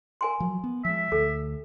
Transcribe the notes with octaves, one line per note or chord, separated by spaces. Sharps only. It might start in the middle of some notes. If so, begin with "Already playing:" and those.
A#4 G#5 C6
F3 F#3
B3
F3 G#3 E5
D2 A4